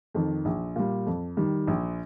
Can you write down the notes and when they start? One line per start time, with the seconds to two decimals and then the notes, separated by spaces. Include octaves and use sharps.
0.14 F2 D#3
0.45 A#1
0.76 A#2 G3
1.07 F2
1.37 D#3 G3
1.67 A#1